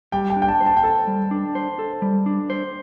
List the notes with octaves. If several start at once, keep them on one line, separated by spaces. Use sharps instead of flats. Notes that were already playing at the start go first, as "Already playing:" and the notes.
G3 G5
G5
D4
G5
A5
C5
A5
G5
A4 A5
G3
D4
C5
A4
G3
D4
C5